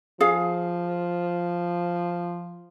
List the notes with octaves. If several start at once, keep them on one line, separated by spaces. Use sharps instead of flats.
F3 G#4 F5